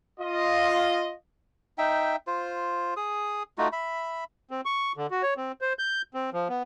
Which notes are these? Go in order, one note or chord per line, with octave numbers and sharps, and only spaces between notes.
F4 D#5
D#4 E5 G5
F4 C5
G#4 D#6
A3 D#4 F4 F#4
E5 B5
C4
C#6
D3
F#4
C#5
C4
C5
G6
C4
F3
B3